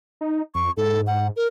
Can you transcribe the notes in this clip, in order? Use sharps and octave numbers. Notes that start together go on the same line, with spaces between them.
D#4
F2 C#6
G#2 A4
F#5
A#4